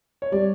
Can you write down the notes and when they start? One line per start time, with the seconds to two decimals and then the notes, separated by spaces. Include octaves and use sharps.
0.22 C#5
0.32 G3 D5